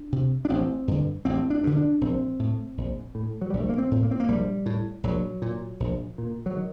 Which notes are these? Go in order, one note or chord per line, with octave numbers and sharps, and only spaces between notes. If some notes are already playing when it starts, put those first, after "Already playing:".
Already playing: D4
C3
D4
A1 C4
G2 D3
A1 C4
D4
G2 D3
D4
A#1 C4
A2
A#1
A2
F#3
A#1 G3
A3
A#3
C4
A2
A#3
C4
A#3
A#1 G3
A2
A#1 F#3
A#2
A#1
A#2
F#3
D#3